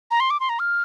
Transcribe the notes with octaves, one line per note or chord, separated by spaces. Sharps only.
A#5
C6
D6
C6
A#5
F6